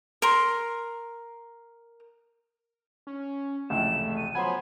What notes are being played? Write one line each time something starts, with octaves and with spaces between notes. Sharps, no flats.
A#4 C6
C#4
F1 C#2 E3 A3 E7
D#7
F3 F#3 B3 F#5 G#5 B5 C6